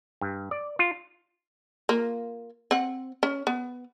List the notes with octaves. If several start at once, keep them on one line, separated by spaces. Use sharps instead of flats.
G2
D5
F4
A#3 F4
C4 F#5
C#4
B3